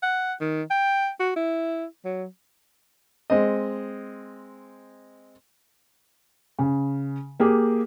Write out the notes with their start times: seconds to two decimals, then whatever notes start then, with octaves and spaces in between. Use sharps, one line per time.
0.03 F#5
0.41 D#3
0.70 G5
1.20 F#4
1.36 E4
2.05 F#3
3.30 G#3 C4 D#5
6.59 C#3
7.40 A#3 G4 G#4